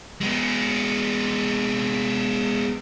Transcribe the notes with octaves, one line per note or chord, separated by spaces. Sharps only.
G#3 B3